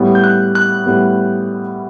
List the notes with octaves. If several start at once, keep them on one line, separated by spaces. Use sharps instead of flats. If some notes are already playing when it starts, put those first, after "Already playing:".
Already playing: A2 G3 B3
G6
F#6
F#6
A2 G3 B3